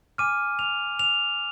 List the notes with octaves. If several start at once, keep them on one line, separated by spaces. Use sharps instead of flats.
G#5 D6 F6 D#7
F7
F7